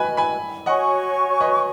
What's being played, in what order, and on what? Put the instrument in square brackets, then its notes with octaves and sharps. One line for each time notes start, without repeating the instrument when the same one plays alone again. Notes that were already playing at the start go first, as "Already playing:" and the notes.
Already playing: [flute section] F#4 B4 D#5 [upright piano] G#5 B5
[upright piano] G#5 B5
[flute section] F#4 C#5 G#5 C#6 [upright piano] D#5 F#5
[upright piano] B4 D#5